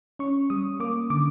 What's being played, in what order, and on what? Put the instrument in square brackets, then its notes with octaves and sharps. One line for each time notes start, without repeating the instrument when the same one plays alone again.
[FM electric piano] C#4 C#6
G3 D#6
A#3 D6
D3 D6